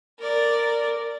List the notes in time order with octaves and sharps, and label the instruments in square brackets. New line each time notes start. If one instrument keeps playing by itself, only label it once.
[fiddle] A#4 D5